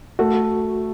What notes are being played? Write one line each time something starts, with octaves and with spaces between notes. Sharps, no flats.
A3 F#4